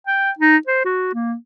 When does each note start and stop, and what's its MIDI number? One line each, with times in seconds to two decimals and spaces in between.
0.07 0.31 79
0.39 0.57 63
0.67 0.81 72
0.85 1.09 66
1.14 1.35 58